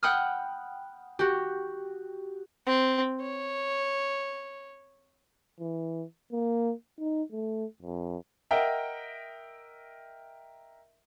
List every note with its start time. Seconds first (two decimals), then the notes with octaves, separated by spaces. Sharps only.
0.03 F#5 G5 B5 D#6 F6
1.19 F#4 G4
2.66 C4
3.20 C#5
5.60 E3
6.33 A#3
7.00 D#4
7.32 A3
7.82 F2
8.51 A#4 D#5 E5 F#5 G5 A#5